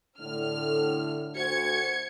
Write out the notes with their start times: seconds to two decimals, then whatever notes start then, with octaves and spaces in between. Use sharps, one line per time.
0.21 A2 D3 F6
1.36 D2 F#4 C5 G#6 C#7